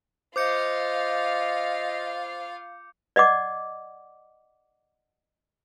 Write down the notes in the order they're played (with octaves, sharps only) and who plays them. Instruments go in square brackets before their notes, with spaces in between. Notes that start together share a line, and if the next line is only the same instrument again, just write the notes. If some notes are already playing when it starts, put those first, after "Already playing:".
[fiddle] F4 F5 [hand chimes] C5 [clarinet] D#5 [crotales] D6 G6 C#7
[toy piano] D5 D#5 F#5 D6